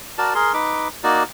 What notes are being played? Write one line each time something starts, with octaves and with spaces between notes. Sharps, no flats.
F#4 A#4 D5 A5
G#4 A#4 C6
D#4 B4 D6
A#3 D#4 F#4 D5